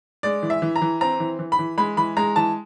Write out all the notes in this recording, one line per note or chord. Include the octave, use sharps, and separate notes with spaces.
G#3 D5
E3
E5
E3
A#5
E3
C4 A#5
E3
E3
B5
E3
G#3 B5
E3 B5
G#3 A#5
E3 A5